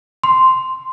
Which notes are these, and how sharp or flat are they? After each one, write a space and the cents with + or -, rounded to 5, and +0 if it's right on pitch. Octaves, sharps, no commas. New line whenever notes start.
C6 -5